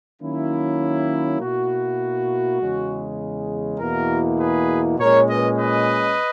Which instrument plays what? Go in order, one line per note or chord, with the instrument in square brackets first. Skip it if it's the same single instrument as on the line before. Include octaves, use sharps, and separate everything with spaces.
[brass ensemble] D#3 F#3 A#3 C#4 E4
B2 A#3 E4 F#4
E2 C#3 G#3
E2 B2 A#3 E4 F#4 A#4
G#4 B4
A#2 G#3 C#4 A#4 C#5
B4 D#5
B4 D#5